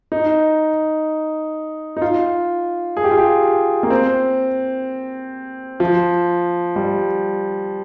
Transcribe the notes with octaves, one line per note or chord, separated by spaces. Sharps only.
D#4
D#4
F4
G#4
G4
F4
G4
A#3
C4
F3
G3